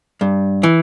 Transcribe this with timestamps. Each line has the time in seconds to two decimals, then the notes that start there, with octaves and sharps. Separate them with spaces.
0.21 G2
0.63 E3